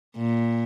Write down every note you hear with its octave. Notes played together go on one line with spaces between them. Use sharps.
A#2